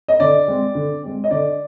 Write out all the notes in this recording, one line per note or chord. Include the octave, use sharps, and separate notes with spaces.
D#5
D3 D5
G#3 C4
D3
G#3 C4
D#5
D3 D5